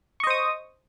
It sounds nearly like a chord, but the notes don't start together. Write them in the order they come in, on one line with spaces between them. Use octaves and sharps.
C#6 D#5 C5 D#6